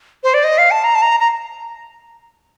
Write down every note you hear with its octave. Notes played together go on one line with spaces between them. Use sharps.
C5
D5
D#5
F5
A5
A#5
A5
A#5
A#5